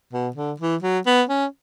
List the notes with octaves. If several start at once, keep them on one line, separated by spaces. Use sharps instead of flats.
B2
D3
E3
F#3
B3
C#4